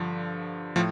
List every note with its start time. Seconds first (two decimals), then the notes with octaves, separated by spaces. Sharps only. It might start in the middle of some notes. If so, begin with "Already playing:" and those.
Already playing: G2 D3 F3
0.76 A2 F3